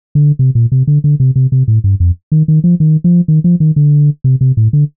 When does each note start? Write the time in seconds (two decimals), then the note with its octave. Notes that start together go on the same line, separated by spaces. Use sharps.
0.15 D3
0.39 C3
0.55 A#2
0.72 C3
0.87 D3
1.04 D3
1.20 C3
1.36 C3
1.52 C3
1.68 A2
1.84 G2
2.00 F2
2.32 D#3
2.48 D#3
2.64 F3
2.80 D#3
3.04 F3
3.28 D#3
3.44 F3
3.60 D#3
3.76 D3
4.24 C3
4.41 C3
4.57 A2
4.73 D3